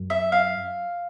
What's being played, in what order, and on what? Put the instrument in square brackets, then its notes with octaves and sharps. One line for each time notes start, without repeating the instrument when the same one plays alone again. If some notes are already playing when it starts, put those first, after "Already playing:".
Already playing: [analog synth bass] F#2
[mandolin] E5
F5